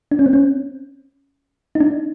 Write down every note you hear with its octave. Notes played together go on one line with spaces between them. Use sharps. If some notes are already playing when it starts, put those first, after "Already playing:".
D4
C#4
C4
C#4
D#4
D4